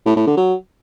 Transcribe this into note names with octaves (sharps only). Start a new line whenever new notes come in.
A2
A2
D3
F#3